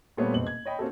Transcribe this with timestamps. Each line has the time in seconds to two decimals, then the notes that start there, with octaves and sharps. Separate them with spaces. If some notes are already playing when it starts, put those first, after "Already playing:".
0.17 A#2 G3 A3 B3 C4 C#5
0.34 F#1 B2 C4 F#7
0.47 G#6
0.66 C#5 D#5 G5 B5
0.79 A#3 C4 C#4 F#4 G4 A4